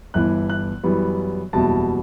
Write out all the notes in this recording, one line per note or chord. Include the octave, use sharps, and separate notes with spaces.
G1 G2 E3 B3 F#6
F#6
F#2 E3 G3 B3
F#1 E2 B2 G3 A5